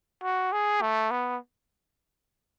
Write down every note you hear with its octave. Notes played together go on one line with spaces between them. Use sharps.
F#4
G#4
A3
B3